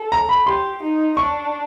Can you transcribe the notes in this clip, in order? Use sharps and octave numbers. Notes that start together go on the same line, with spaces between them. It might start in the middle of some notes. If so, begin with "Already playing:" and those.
Already playing: A4
A#5
B5
G4 C6
D#4
D4 C#6